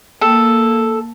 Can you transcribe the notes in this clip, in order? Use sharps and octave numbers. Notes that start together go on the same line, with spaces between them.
A#3 A4